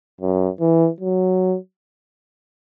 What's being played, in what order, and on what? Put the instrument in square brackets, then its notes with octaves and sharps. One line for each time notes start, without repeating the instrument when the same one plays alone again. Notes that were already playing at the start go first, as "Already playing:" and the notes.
[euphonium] F#2
E3
F#3